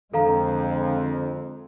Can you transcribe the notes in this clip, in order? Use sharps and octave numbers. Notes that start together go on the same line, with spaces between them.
F2 D3 G#3 C4 A4 F5 A#5